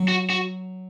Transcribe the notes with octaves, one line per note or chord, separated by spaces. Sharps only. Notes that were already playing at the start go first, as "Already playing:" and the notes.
Already playing: F#3
F#4
F#4